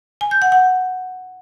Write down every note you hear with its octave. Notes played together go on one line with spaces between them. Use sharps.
G#5
G6
F#5
F#5